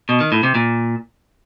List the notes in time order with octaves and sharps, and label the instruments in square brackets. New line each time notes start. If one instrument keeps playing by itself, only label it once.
[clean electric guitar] B2
D#3
A2
C3
A#2